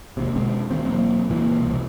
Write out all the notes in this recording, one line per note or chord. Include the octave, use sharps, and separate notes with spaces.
F1 D#2 C3
B2 D3 G#3 C4
D2 D#3 F3 C4
E1 F#3 A#3 C4
C#2 A#2 E3
E1 C2